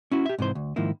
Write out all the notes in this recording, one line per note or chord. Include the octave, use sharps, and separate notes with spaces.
C#4 E4 F#4
G4 E5
G#2 C3 E3 C5
D2
G#2 D#3 F3 A#3 E4